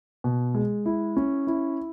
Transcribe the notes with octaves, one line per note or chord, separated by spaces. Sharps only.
B2
G#3
E4
C#4
E4